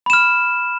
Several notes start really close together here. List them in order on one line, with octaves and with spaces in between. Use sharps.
B5 E7 F6